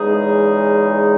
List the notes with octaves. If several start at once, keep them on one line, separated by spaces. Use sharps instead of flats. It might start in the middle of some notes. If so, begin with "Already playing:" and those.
Already playing: E2 C#3 G#3 D#4 G#4